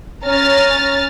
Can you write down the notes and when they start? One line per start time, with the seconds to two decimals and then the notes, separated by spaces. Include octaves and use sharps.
0.25 C#4 A#5 F6 A6